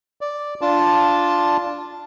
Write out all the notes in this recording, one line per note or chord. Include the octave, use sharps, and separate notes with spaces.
D5
D4 F4 A5